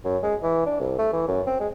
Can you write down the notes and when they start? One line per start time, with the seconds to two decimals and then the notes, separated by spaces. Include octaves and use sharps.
0.05 F#2
0.23 G#3
0.43 E3
0.66 D4
0.80 C2
0.99 A3
1.13 E3
1.28 F#2
1.46 C4
1.60 G#3